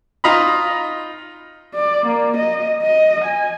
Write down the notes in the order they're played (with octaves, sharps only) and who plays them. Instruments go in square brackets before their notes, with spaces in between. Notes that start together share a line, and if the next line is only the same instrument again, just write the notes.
[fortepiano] D#4 F4 D#5 A#5 B5
[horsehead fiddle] D5
A#3
D#5
D#5
G#5